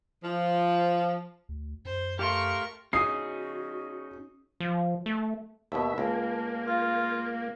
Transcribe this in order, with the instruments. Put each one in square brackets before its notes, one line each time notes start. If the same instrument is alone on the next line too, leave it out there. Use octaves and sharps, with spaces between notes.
[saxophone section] F3
[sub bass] D2
[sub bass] F#2 [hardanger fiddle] C5
[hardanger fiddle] A3 C#6 [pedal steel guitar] G4 F5 C6 [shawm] A#4
[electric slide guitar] C#4 D#4 G#4 [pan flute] F#4 [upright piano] D#6 C7
[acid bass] F3
A3
[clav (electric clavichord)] D#2 B2 [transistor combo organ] E5 [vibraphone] A5
[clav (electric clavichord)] C#2 [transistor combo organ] A#3
[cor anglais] F4 [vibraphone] F5